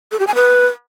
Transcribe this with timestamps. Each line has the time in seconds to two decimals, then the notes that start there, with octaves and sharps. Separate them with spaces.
0.12 A4
0.19 G4
0.27 G#5
0.35 B4